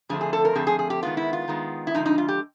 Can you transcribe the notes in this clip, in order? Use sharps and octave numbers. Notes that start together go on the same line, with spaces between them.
F2 D3 F3 A3 C4 G#4
G#4
A4
A#4
F2 D3 F3 A3 C4 G#4
G#4
G#4
G4
D#3 G#3 B3 F4
E4
F4
D#3 G#3 B3
E4
D3 F3 G#3 D#4
D#4
F4
G4